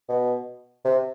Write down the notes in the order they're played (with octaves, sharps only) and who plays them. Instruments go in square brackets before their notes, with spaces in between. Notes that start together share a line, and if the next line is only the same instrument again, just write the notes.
[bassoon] B2
C3